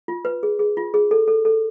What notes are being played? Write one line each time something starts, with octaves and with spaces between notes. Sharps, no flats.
F4
B4
G#4
G#4
F4
G#4
A4
A4
A4